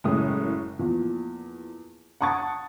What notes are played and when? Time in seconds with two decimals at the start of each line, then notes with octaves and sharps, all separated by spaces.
0.04 F#1 F#2 A2 G#3 D#6
0.79 E2 A#2 F3
2.21 F#5 A5 C#6 D#6 A6